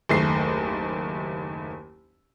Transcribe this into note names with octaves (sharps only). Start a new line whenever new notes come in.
F#1 D#2 A3 C7